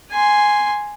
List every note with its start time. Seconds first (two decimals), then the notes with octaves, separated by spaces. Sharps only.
0.12 G#5 C6